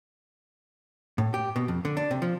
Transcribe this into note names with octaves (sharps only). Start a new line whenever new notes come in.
A2
G4
B2
F2
D3
D4
C3
F3